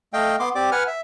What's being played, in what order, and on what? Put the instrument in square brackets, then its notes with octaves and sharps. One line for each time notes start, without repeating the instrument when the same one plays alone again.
[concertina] A3 D#5 F5 G5
B3 C6 D6
C4 G4 D5 D6
B4 F#5 G#5 F6
E5